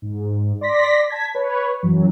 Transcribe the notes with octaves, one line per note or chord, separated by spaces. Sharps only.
G#2
D5 C6 A#6 B6
A5 G#6 B6
B4 C#5
F#2 E3 F#3